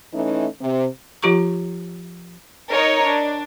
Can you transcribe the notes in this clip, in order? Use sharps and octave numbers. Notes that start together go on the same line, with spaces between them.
E3 A3 C#4 D#4
C3
F3 F4 G4 A#5 C#6
D#4 A#4 C#5 D#5
D4